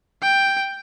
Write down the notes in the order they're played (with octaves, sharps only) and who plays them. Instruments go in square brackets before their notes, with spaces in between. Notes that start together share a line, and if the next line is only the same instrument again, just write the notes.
[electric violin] G5